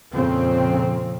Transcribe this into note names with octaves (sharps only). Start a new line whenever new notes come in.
F2 A#2 C#3 F3 C4